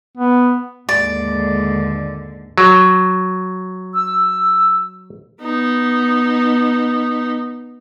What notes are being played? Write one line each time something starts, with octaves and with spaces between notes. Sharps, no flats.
B3
D#2 G#2 D3 D5
F#3
E6
B3 D#4